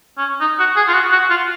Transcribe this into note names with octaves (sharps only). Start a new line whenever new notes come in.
C#4
D#4
F#4
G#4
F4
F#4
F#4
F4